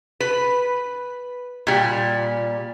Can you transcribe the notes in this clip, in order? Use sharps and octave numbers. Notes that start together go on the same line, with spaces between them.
B4
A#2 G3